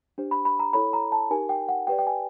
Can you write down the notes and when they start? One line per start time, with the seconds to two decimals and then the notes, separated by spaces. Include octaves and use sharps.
0.18 D4 G4 C5
0.31 B5
0.45 B5
0.59 A#5
0.73 E4 A4 C#5 B5
0.93 A#5
1.12 A5
1.31 D#4 G4 A#4 G#5
1.49 G5
1.68 F#5
1.87 G4 B4 D5 G5
1.99 G5
2.07 G#5